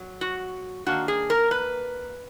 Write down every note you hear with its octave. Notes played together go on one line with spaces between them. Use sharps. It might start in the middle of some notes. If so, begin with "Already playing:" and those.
Already playing: F#3
F#4
D#3 A#3 D4 F#4
G#4
A#4
B4